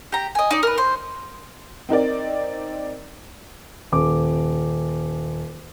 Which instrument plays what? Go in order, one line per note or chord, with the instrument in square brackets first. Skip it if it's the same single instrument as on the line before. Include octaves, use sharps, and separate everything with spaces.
[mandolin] G4 A#5
D#5 G#5
D#4 D5
A#4 B4
C5
[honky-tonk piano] C4 D#4 A#4 D5
[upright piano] D#1 D6